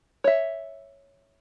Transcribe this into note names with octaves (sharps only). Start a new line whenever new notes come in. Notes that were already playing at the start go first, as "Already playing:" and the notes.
C#5 E5